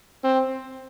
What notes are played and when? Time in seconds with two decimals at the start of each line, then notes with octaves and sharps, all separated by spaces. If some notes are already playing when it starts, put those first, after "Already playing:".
0.24 C4